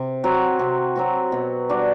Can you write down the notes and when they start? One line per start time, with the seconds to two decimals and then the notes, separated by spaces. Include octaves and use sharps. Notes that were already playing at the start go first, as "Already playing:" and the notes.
Already playing: C3
0.24 F#3 C4 F#4
0.59 C3
0.96 F#3 C4 F#4
1.32 B2
1.69 G3 D4 F#4